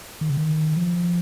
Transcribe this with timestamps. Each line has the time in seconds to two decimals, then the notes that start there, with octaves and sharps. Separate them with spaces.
0.21 D#3
0.29 C#3
0.37 D#3
0.77 F3